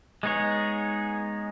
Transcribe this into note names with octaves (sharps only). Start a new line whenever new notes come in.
G#3 B3 D#4 G#4 C#5